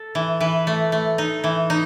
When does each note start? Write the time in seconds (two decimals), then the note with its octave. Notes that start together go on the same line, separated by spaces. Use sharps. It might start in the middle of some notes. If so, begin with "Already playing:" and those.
Already playing: A4
0.15 E3
0.41 E3 B4
0.67 A3
0.92 A3
1.18 D#4
1.44 E3
1.70 D#4